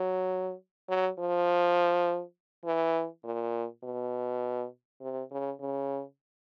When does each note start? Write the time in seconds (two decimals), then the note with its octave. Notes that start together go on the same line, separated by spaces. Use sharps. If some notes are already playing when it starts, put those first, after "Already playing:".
Already playing: F#3
0.89 F#3
1.18 F3
2.65 E3
3.24 A#2
3.83 B2
5.01 C3
5.31 C#3
5.61 C#3